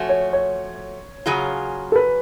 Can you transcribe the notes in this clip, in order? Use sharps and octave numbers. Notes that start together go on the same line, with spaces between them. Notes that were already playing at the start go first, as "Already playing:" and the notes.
Already playing: F3 A3 C#4 F#4
C#5
C#5
C#3 F#3 C#4 F4 G#4
A4
B4